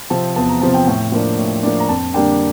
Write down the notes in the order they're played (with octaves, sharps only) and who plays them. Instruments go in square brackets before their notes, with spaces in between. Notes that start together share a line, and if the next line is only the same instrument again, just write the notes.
[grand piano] C3 F3 C4 A5
E2 A5
A#5
C3 F3 C4 A5
G5
A2 G5
F3 A#3 D4
A2
F3 A#3 D4
A#5
F2 A5
D3 G3 A#3 D4 G5